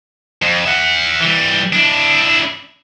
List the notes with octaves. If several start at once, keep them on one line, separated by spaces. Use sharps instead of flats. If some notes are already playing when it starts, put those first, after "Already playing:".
F2
E5 F#5
E3 G3
D4 E4